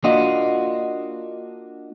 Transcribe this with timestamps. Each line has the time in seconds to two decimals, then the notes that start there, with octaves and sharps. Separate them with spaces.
0.04 A#3 D4 F4 F#4 D#5